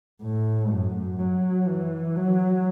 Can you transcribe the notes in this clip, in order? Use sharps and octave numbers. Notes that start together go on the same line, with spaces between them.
A2
F#2
F#3
E3
F#3